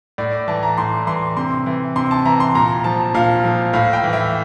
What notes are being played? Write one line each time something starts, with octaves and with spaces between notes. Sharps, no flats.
A2 D5
E3 A5
A#5
A2 C6
E3 C6
C3 C6
E3
C3 C6
A5
E3 A#5
C6
A#2 A#5
F3 A5
A#2 F5
F3
A2 F5
G5
E3
E5